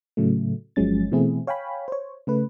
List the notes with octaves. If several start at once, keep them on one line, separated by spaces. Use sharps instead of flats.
A2 C#3 F#3 A3
G1 F3 F#3 G#3 C#4 A6
B2 E3 A3 C4 E4 G#4
C#5 F5 G5 G#5 B5
C5 C#5
C#3 A3 B4